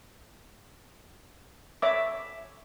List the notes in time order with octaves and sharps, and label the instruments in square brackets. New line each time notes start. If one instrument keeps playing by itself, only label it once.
[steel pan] C#5 E5 D6